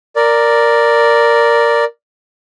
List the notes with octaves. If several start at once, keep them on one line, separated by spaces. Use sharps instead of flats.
A#4 D5